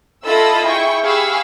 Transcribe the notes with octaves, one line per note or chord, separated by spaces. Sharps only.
E4 F4 A4 D#5 B5 E6
E4 G#4 G5 C#6
G4 G#4 F5 B5 C#6 E6